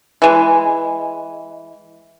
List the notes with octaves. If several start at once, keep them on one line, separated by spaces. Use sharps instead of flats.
E3 G#3